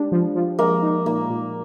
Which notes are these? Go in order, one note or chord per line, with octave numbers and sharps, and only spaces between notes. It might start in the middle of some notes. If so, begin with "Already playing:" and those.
Already playing: G3 G#3 D4
F3
F3
G#3 A#3
D#4
A#2 A#3
A#2